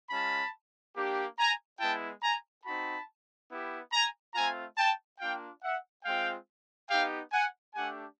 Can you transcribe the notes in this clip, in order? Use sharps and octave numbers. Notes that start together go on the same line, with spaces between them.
G#3 C#4 F4 A5 B5
A#3 D4 G4
G#5 A#5
G#3 B3 E4 G5 A5
G#5 A#5
C4 D#4 F#4 A5 B5
B3 E4 G4
G#5 A#5
A3 C4 F4 G#5 A#5
G5 A5
A#3 D4 F4 F5 G5
E5 F#5
G#3 C4 F4 F5 G5
B3 D#4 G4 F5 G5
F#5 G#5
A3 D4 G4 F#5 G#5